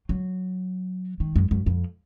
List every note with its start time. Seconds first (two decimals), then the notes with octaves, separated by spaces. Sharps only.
0.09 F#3
1.20 D#3
1.36 F#2
1.51 F#2
1.66 F2